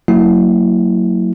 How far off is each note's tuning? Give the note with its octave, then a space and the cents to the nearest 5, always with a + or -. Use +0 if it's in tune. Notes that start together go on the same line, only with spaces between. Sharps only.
F#3 +0 A#3 -30 E4 +0